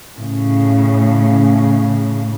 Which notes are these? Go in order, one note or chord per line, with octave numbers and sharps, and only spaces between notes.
A2 C#3